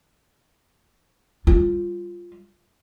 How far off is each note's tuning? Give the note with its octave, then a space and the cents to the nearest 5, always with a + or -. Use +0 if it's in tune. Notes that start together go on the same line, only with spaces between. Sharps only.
G3 +0 F4 +0